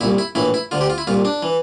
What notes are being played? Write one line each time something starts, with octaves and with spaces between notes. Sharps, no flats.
C2 A#2 E4
E4
A#1 A2 E3 E4
E4
D2 D3 F4
G4
F4
E4
C2 A#2 F4
D4
E3